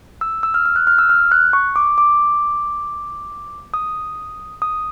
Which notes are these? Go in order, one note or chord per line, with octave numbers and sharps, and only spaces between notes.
E6
E6
F6
F6
F#6
F6
E6
F6
F#6
C#6
D6
D6
D#6
D#6